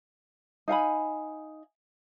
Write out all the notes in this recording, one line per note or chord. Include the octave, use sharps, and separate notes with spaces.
D#4 F5 G#5 B5